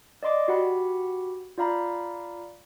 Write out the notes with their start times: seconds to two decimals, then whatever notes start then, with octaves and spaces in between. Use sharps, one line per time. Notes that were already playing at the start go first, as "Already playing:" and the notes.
0.23 D5 D#5 C6 D6
0.48 F#4 G4 F#5 B5
1.58 F4 D5 F5 A#5 B5